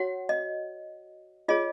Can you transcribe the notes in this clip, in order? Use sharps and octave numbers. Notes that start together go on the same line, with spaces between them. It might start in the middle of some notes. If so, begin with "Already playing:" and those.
Already playing: F#4 C#5 F#5
D#5
F4 G#4 C#5 D#5